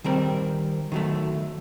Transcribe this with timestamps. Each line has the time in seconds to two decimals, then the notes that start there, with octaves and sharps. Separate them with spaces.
0.04 D#3 G3 C4 A#4
0.92 D#3 F#3 A3